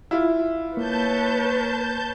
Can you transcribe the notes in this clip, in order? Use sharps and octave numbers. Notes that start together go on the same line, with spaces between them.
E4 F4
A#3 B4 C#5 A5 G6